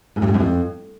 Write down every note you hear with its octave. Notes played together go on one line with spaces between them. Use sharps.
G#2
G2
G#2
F#2
F2